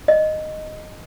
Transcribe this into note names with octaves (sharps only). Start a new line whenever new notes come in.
D#5